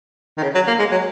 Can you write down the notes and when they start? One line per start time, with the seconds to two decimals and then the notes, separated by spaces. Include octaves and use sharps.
0.37 D#3
0.43 C#3
0.55 F#3
0.67 A#3
0.79 G#3
0.91 F#3